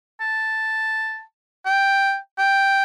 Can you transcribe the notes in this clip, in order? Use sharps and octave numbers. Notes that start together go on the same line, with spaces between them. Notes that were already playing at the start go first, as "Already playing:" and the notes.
A5
G5
G5